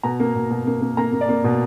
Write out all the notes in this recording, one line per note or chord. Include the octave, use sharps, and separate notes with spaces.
B2 A#5
A#3
B2
B2
A#3
A#3
A#3 A#5
A#3
D5
A#3
B2